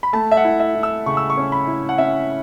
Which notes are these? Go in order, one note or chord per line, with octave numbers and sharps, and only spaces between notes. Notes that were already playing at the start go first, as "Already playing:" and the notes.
B5
A3 A5
E5
F#5
E4
E5
E4
E6
C#3 C#6
E6
C#6
C#4
B5
E4
F#5
C#4 E5